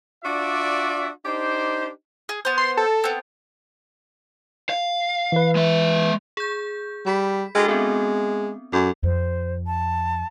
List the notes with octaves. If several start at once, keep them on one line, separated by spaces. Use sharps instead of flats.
D4 F4 F#4 D5 E5
D4 D#4 G4 C5
G#4
B3 C5
C6
A4
B3 C4
F5
E3 B4
G#3 E5
G#4 G6
G3 B5 B6
G#3 D4 F#4 A4
G#3 B3 C4
F#2 A4
F2 C5
A5